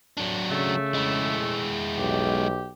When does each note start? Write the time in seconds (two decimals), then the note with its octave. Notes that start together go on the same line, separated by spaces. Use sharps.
0.17 F#3 D4
0.50 C#3 A3
0.95 G#3 E4
1.98 B1 G4